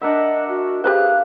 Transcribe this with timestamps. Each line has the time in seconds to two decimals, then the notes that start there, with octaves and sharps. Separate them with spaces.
0.02 D4 A#4 D#5 E5 F#5
0.49 F#4
0.84 G4 G#4 B4 C5 F5 F#6